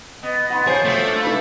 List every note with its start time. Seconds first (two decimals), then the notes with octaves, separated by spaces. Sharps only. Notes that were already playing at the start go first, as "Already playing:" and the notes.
0.23 B3 D#5
0.50 B3 F#5 B5 C6
0.67 F3 G#4 C5 C#5
0.85 F3 A3 C4 F#4
1.05 D4
1.23 C3 D4 E4 B4 E5 B5